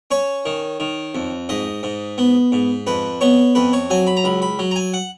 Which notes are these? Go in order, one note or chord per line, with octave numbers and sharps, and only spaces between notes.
C#4 C#5
D#3
D#3
F2
G#2 D#5
G#2
B3
G#2
F2 B4
B3 C#5
F2 B4
C#5
F#3 G#5
B5
A#5
C#2 B5
B5
F#3
A#5
G#5
F#5